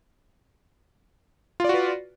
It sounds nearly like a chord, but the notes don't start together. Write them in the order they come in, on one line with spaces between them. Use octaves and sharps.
F4 D5 F#4 B4